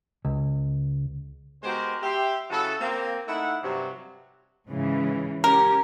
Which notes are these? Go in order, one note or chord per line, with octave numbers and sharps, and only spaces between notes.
C#2
G#3 B3 F#4 G4 A#4 C5
G4 E5 C6
C#3 F#3 E4 F#4 A4
A#3 C4
A3 D#4 E4 E5 F#5
G2 C3 F#3
G#2 C#3 E3
C#4 G4 A#4